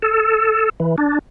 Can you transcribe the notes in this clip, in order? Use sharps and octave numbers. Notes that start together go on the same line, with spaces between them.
A4
E3
D4